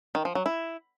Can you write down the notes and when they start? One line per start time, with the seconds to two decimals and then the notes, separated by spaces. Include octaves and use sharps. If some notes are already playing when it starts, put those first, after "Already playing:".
0.15 D#3
0.25 F3
0.35 F#3
0.46 E4